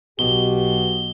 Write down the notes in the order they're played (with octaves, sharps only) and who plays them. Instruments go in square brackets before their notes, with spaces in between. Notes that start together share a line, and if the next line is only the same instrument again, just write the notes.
[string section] B1 [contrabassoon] B2 [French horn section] G4 [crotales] G7